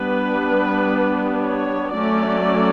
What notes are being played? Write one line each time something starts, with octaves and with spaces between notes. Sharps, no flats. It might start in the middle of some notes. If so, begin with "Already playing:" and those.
Already playing: G3 B3 D4 B4
C#5
F#3 A3 C#4 D5